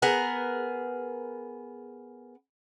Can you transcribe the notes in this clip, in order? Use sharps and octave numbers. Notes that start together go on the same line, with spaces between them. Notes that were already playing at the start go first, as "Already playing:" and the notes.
B3 G#4 A#4